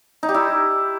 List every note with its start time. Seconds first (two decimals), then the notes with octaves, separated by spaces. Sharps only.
0.23 D#4
0.29 G4
0.34 E4